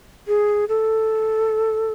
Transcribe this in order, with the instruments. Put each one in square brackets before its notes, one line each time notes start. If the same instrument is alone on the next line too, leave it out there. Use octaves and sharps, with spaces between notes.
[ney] G#4
A4